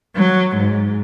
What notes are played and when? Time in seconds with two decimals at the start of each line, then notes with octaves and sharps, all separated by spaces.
0.16 F#3
0.57 G#2